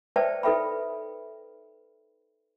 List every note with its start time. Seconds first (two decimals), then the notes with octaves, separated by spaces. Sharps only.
0.16 B4 C5 D5 E5 G5 A5
0.43 D#4 A4 B4 E5 G5 B5